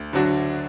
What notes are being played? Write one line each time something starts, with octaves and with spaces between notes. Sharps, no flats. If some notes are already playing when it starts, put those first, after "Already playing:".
Already playing: D2
D3 F#3 D4 F#4